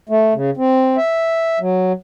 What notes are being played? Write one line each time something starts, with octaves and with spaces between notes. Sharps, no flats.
A3
C#3
C4
E5
F#3